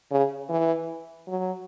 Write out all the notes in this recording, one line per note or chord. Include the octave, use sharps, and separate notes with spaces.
C#3
E3
F#3